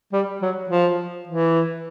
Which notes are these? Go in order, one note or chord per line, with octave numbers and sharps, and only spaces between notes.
G3
F#3
F3
E3